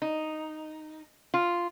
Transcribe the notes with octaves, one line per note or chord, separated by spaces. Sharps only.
D#4
F4